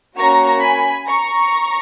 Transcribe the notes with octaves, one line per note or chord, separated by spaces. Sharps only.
A#3 C#4 F#4 A#5 C#6
G#5 B5
A#5 C#6